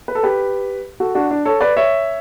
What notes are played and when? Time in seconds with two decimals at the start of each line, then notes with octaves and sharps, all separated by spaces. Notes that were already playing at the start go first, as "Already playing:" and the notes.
0.08 B4
0.15 A4
0.23 G4 B4
1.00 F#4 A4
1.15 D4 F#4
1.31 D4
1.45 A4 C#5
1.61 B4 D5
1.77 C#5 E5